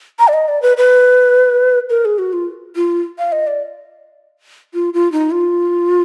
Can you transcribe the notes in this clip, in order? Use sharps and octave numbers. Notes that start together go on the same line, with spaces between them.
A#5
D5
D#5
D5
B4
B4
A#4
G#4
F#4
F4
F4
F5
D#5
D5
F4
F4
D#4
F4